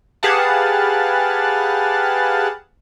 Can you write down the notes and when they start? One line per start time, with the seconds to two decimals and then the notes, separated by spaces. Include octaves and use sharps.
0.23 G4 G#4 B4 F5 F#5 A5